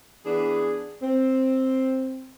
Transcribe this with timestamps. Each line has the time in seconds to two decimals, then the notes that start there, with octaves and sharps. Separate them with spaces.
0.25 E3 B3 D4 G#4
1.02 C4